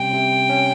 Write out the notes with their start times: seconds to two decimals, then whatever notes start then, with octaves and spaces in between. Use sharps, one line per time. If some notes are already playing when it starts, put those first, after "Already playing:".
Already playing: C3 G3 C#4 G5
0.13 C3
0.50 C#4